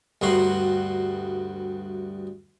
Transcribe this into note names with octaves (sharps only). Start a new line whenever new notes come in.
D2 G2 B3 F#4 C6